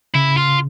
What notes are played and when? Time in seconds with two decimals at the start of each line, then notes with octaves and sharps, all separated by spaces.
0.14 C#3 E4
0.37 F4